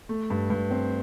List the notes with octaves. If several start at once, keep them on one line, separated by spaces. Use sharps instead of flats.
A3
G2
G2
C4